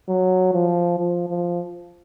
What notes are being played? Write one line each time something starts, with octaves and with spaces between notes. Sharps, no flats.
F#3
F3
F3
F3